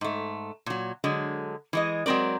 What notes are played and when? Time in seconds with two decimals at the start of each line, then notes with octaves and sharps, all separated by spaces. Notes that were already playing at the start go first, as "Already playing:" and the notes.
0.01 G#2 A3
0.66 A#2 F#3
1.04 D3 F#3 G#3
1.73 E3 G#3 D#5
2.06 F#3 G#3 C4 A#4 D5